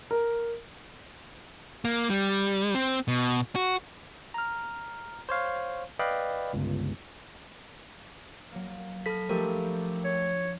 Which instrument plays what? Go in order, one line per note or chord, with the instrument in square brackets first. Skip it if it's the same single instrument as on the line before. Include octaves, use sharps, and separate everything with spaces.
[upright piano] A#4
[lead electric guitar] A#3
G3
C4
B2
F#4
[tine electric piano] A#5 F6
C5 C#5 F5
B4 D5 D#5 F5 G5 B5
G1 C#2
[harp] F#3 A#3
[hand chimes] A4 B6 [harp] B5 F6
[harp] F3 G#3 D4 [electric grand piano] A3 G4 A4 [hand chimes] A#4
[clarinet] C#5